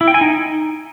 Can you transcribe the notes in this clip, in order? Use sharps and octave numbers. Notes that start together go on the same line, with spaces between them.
E4
G5
G#5
D#4